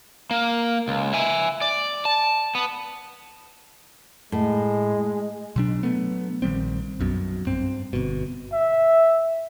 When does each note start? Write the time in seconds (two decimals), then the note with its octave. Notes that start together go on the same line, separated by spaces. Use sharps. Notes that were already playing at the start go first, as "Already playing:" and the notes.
0.31 A#3
0.88 C#2
1.14 E5 G#5
1.61 D5
2.05 A5
2.55 B3
4.32 A2 G#3
5.56 B2 F#3 D4
5.83 F#3 A3 B3
6.42 A#1 D#3 G3 C4
7.00 B1 F#2 B2
7.46 G2 C4
7.93 G1 B2
8.53 E5